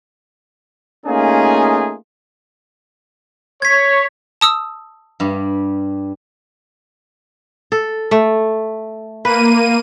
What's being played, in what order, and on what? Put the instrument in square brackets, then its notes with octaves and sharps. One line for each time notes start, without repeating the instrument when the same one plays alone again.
[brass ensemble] A3 A#3 C#4 D#4 F4 G#4
[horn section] C#5 [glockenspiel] G#6 B6
[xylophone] A5 D#6 E6
[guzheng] G2 G3
[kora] A4
A3
[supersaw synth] A#3 D#7 [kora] B4